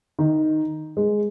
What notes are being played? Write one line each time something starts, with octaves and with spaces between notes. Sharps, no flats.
D#3
G#3